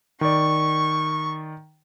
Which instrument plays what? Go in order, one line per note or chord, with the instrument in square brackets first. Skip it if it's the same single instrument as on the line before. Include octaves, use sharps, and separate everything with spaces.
[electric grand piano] D#3 D5 [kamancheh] C#6